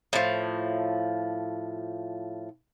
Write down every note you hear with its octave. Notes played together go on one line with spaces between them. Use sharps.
A2 F3